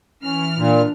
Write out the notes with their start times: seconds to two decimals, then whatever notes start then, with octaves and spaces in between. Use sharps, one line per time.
0.21 E3 C#4 F6
0.57 A#2 D4